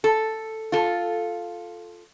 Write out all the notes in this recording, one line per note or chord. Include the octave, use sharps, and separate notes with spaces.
A4
F4 A4